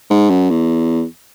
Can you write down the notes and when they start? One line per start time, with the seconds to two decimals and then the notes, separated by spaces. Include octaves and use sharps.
0.10 G#2
0.30 F#2
0.50 E2